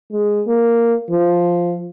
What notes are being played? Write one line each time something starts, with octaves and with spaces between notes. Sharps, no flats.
G#3
A#3
F3